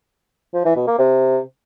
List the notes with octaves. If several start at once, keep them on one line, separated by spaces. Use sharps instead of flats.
F3
E3
B2
A#3
C3